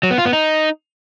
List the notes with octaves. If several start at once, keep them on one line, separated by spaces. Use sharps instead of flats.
F#3
B3
F4
B3
D#4